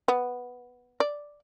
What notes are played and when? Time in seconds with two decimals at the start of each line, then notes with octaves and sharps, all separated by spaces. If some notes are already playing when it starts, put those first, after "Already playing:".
0.08 B3
1.00 D5